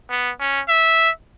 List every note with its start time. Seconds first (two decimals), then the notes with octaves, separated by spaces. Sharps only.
0.10 B3
0.40 C#4
0.69 E5